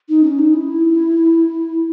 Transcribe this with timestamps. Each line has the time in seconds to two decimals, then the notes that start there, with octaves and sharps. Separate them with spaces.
0.09 D#4
0.24 C#4
0.39 D#4
0.54 E4